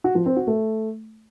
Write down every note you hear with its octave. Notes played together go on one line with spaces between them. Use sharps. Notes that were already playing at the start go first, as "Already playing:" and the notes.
F#4
F3
C4
F#4
A3